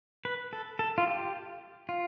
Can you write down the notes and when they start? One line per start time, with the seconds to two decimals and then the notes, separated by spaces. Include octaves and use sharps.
0.25 B4
0.53 A4
0.79 A4
0.98 F4
1.07 G4
1.89 F4